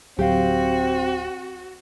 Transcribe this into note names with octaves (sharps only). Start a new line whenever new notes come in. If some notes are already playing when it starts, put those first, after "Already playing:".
D1 F#3 C4 F#4 G4 F5